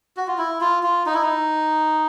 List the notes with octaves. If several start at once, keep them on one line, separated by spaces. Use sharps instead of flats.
F#4
F4
E4
F4
F4
D#4
E4
D#4